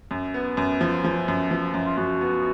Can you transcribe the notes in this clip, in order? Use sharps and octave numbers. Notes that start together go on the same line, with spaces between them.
F#2
B3
F#2
F3
F3
F#2
F3
F#2
F4
F#2 F#4
B3